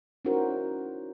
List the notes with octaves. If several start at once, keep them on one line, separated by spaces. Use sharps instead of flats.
C#4 D#4 E4 F#4 A#4 C5